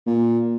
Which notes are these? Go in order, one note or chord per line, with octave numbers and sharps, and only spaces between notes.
A#2